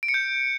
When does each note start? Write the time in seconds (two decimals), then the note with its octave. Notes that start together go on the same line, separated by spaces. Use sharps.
0.03 D7
0.09 C#7
0.14 G6